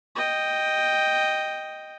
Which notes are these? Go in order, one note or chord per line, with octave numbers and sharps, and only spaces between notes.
D#5 G5